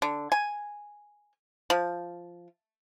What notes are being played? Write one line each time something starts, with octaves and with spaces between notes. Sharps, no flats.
D3
G#5
F3